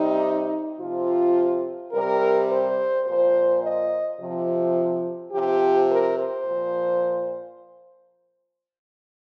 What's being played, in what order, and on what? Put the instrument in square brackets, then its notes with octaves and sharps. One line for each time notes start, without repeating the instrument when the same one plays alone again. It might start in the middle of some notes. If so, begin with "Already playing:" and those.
Already playing: [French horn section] C3 G3 D#4
C3 F3 F4
C3 G3 A#4
C5
A#2 F3 C5
D#5
C3 F3
C3 F3 G4
A#4
C5
A#2 F3